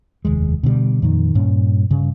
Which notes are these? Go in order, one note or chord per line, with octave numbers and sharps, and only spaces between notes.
F1 D#2 G#3
B2 D3 E3 G3
F2 A#2 D#3
G2 A#2 C#4
G2 C#3